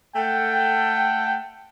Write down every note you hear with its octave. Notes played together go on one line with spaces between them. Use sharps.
A3 A4 F#5 G5